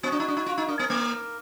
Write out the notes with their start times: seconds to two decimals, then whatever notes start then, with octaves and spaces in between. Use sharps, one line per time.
0.03 B3 F#4
0.12 D4
0.20 D#4
0.28 D4
0.37 D#4
0.46 F4
0.58 D#4
0.68 D4 A#4
0.79 B3
0.90 A#3